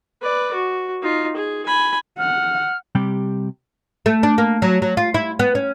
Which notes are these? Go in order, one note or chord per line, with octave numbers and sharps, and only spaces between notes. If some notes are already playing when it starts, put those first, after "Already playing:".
B4 D5
F#4
D#4 F4
G#4
G#5 B5
F#5 F6
C3 G3 G4
A3
D4
A#3
F#3
F#3
F4
E4
B3
C#4